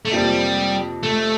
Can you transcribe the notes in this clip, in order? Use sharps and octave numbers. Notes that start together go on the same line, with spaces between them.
A3
F2 C3 F3 G3 A#3
A3